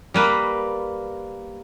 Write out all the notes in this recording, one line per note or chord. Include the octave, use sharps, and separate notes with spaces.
G3 A#3 B4